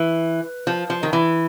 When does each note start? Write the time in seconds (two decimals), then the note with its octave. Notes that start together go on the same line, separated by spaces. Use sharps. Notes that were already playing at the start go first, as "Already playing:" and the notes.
Already playing: E3
0.67 F3
0.90 F3
1.03 D#3
1.13 E3